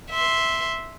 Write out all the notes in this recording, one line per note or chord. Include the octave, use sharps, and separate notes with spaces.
E5 C6